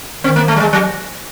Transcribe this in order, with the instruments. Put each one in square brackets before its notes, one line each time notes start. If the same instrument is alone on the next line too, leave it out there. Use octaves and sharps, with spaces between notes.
[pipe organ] D#3 [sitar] C4
[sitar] A#3
A3
G3
G#3
F#3